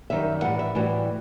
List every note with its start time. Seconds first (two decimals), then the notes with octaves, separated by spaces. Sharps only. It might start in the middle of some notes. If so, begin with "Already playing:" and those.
0.10 F#2 D#3 G3 E5
0.42 A2 E3 G3 F#5
0.59 E5
0.75 A2 E3 G3 F#4